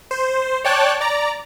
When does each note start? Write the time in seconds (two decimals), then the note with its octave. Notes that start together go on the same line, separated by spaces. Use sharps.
0.11 C5
0.64 C#5 D5 G5 A5 F#6
1.01 D5 A#5